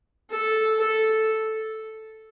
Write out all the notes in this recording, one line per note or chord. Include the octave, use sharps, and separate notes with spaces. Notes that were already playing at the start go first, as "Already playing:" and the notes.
A4
A4